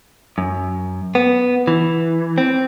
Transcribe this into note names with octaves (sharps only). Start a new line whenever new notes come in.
F#2
B3
E3
C4